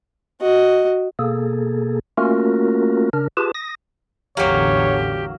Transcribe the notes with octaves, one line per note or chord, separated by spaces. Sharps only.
F#4 D#5
B2 A#3 G#4 A4
A3 A#3 C#4 F4 F#4 A#4
C#3 D4 A#4
F4 G4 G#4 B4 A5
D#6 A#6
A1 E2 D3 F#3 A#3 G4 C#5